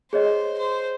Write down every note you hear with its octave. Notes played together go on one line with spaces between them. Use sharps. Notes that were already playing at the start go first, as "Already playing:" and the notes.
G#4 C5 C#5 D#5
C5